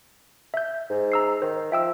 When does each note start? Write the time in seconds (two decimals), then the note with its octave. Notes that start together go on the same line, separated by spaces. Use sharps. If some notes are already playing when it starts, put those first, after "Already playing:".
0.54 E5 G6
0.90 G#2
1.12 A#5 E6 C7
1.42 D#3 C5
1.72 F3 E5 G5 E6